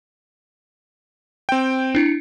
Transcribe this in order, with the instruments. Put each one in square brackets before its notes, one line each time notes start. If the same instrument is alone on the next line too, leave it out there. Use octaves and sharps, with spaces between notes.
[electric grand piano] C4 G5
[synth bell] D4 E4 C#7